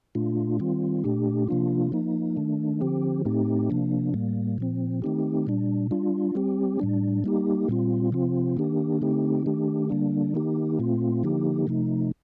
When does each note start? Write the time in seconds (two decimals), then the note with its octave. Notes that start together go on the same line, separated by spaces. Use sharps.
0.15 A#2 A3 D4 F4
0.59 D#3 G3 C4 F4
1.04 A#2 A3 D4 G4
1.47 C3 F3 A#3 D4 F4
1.92 F3 A#3 D#4
2.37 D#3 A3 D4
2.81 D3 F3 C4 G4
3.25 A2 A3 C4 D#4 G4
3.70 C3 F3 A#3 D4
4.14 A2 G3 A#3
4.58 A#2 F3 C4
5.02 D#3 A3 C4 D#4 G4
5.47 A#2 G3 D4
5.91 G3 D4 F4
6.35 G3 C4 G4
6.80 A2 G3 D4
7.24 G3 A#3 D#4 G4
7.68 A#2 G3 C4 F4
8.12 C3 F3 C4 F4
8.57 D#3 A#3 D4 G4
9.01 D3 A3 C4 D#4 G4
9.46 D#3 A3 D4 G4
9.89 D3 G3 A#3 D4
10.34 D#3 A#3 D#4 G4
10.79 A#2 A3 C4 F4
11.23 D3 F3 A#3 D#4 G4
11.67 C3 F3 A3 D#4